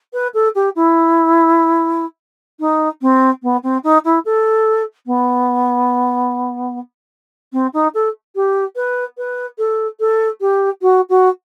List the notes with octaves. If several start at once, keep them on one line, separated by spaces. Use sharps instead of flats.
B4
A4
G4
E4
D#4
C4
B3
C4
D#4
E4
A4
B3
C4
D#4
A4
G4
B4
B4
A4
A4
G4
F#4
F#4